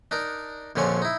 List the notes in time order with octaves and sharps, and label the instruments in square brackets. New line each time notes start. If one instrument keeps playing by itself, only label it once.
[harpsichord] D4 D#4 A#4
A#1 F2 D3 F3 C#4 C#5
D#4 E4